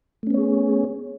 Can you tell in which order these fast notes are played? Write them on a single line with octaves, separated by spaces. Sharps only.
A3 C#4 B3 C#5 G#4